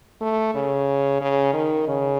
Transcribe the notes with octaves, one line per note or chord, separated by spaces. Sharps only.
A3
C#3
C#3
D#3
C#3